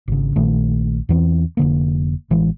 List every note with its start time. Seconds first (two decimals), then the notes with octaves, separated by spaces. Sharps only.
0.08 G#1 C#3
0.36 A#1 A#2 D#3 A3
1.09 E2 E3 C4
1.57 F1 D3 A#3
2.30 A1 E3 G#3